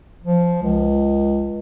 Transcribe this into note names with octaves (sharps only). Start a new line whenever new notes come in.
F3
C#2